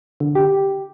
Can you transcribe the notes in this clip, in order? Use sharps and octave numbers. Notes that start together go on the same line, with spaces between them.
D3
G4